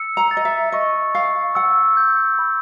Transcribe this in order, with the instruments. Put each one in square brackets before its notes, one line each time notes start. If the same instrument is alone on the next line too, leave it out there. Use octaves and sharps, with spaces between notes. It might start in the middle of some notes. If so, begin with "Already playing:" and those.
Already playing: [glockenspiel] E6 C#7
[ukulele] A#5
[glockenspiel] A6
[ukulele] D#5
E5
[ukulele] D#5 [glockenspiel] C#6
[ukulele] F5 [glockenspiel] C#6
[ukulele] F#5 [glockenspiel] E6
[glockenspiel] G6
B5